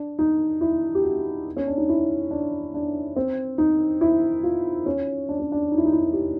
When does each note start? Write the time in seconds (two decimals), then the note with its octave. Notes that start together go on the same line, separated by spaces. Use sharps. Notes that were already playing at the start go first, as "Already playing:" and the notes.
Already playing: D4
0.19 D#4
0.61 E4
0.95 G4
1.03 F#4
1.57 C#4
1.67 D4
1.77 D#4
1.89 E4
2.31 D4
2.74 D4
3.16 C4
3.58 D#4
4.01 E4
4.43 F4
4.86 C#4
5.29 D4
5.39 C#4
5.52 D4
5.72 D#4
5.78 E4
5.85 D#4
5.92 E4
6.00 D#4
6.13 G4